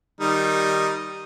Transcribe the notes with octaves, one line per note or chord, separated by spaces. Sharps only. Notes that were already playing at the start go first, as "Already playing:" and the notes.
D#3 G3 D#4